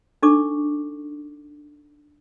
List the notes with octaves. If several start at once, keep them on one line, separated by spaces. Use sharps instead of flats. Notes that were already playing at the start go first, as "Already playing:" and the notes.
D4 D#4 A4 C#6 D6